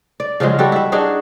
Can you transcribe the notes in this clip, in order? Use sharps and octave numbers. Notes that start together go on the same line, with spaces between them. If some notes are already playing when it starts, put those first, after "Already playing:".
D5
C#3 F3 F#3 G#3
G3 F#4 G4 A4
E4 E5
D4 D#4 F#4 G#4